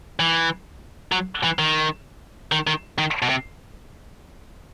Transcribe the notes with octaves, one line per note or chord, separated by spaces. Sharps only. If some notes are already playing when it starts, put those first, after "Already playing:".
E3
F#3
E3
D#3
D#3
D#3
D#3
B2
C3